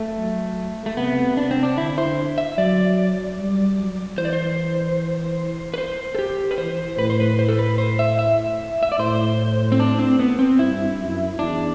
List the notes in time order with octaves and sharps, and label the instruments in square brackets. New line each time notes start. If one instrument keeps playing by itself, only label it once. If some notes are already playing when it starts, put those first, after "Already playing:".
Already playing: [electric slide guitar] A3
[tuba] F#3
[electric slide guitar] A3
[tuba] C3 [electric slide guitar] B3
[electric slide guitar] D4
C4
D4
[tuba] D3 [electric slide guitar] E4
[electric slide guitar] C5
E5
[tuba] F#3 [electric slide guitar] D5
[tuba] G3
F#3
[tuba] E3 [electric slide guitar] C5
[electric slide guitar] D5
C5
B4
C5
A4
G4
B4
[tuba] E3 [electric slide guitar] C5
[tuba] A2 [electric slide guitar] B4
[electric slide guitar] C5
B4
C5
A4
B4
C5
E5
E5
E5
D5
[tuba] A2 [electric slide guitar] C5
[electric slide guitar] C4
D4
C4
B3
C4
[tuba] G2 [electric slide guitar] E4
[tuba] F#2
[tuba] E2 [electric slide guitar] D4